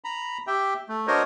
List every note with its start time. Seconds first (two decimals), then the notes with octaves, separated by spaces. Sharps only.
0.04 A#5 B5
0.47 G4 E5 G5
0.89 A3
1.07 D4 F#4 A#4 C5 C#5 D#5